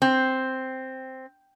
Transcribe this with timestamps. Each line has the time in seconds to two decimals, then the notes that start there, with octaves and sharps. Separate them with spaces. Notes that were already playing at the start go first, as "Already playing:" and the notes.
0.02 C4